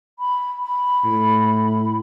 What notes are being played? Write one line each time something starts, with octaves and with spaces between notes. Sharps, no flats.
B5
B5
A2